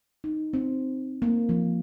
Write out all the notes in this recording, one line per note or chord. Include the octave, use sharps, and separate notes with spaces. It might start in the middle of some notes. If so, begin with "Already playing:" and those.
D#4
C4
A#3
F3